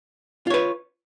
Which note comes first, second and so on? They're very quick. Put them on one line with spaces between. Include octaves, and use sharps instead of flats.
F4 C#5 B4